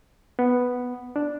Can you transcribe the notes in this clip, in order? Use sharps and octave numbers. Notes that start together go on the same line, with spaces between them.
B3
D4